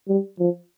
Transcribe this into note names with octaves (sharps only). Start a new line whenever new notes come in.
G3
F3